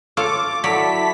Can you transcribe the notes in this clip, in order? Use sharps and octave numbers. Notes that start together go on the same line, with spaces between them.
F4 A4 C#5 D6
F#3 E4 A4 C#5 D5 B6